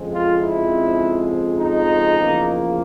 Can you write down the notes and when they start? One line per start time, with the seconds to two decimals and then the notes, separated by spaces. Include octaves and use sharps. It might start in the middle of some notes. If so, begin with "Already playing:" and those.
Already playing: F2 C#3 F3 G#3 C4
0.14 F4
0.43 E4
1.59 D#4
2.18 E2 C#3 F3 A#3